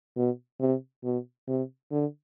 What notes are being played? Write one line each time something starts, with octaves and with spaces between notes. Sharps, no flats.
B2
C3
B2
C3
D3